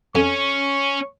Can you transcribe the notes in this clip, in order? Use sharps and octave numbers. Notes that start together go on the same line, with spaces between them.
F2 C#4 C#6